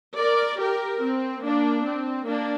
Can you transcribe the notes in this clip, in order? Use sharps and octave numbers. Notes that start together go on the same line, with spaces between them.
A#4 D5
G4 A#4
C4
A#3 D4
C4
A#3 D4